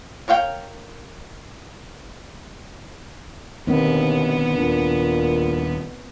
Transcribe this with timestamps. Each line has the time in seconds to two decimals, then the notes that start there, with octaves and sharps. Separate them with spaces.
0.28 A#4 C#5 F5 G5
3.67 D#2 B2 D3 D#3 B3 C4
4.57 D#1 A#2 D4